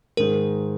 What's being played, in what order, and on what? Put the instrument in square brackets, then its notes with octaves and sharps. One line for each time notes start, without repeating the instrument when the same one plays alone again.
[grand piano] G#2 D#3 G#3 [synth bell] A#4